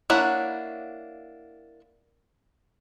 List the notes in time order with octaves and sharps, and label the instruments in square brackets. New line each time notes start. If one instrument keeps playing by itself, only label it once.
[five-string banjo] A#3 D4 E4 C#5 F#5